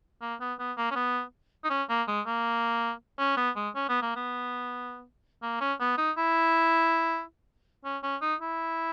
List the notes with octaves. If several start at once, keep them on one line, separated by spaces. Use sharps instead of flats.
A#3
B3
B3
A#3
C#4
B3
D#4
C#4
A#3
G#3
A#3
C#4
B3
G#3
C#4
B3
A#3
B3
A#3
C#4
B3
D#4
E4
C#4
C#4
D#4
E4